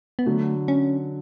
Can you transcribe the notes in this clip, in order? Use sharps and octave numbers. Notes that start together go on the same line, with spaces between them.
B3
D3 F#3 A3
C#4